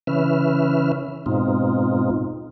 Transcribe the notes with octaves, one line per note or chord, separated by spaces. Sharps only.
C#3 E3 C#4 B4 E5 F6
G#2 B2 C4 D#4 F4